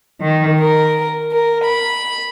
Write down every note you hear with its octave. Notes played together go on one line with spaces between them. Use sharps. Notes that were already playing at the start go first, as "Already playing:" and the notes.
D#3
A#4
A#4
B5